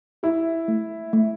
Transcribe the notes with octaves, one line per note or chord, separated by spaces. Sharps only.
E4 G4
A3
A3